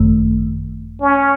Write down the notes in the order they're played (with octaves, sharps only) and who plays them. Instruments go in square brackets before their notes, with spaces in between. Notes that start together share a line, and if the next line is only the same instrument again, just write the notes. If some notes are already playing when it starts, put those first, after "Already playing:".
Already playing: [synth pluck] G#1 F#2 D#3 A3
[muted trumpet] C#4